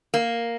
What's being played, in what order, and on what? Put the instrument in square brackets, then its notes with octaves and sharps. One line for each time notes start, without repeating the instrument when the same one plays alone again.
[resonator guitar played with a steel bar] A#3